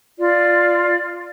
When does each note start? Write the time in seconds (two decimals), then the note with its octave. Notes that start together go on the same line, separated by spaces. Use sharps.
0.18 F4 D5